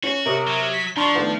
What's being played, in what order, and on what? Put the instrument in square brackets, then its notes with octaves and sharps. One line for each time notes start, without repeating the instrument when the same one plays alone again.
[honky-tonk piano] C#4 [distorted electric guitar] F#4
[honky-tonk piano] C3 C#5 D#6 [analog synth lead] A#4
[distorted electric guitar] F#3
[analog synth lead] B6
[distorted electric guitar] F3 [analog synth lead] D4 [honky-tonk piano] A#5 C6 C#6
[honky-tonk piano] D#3 A3 B3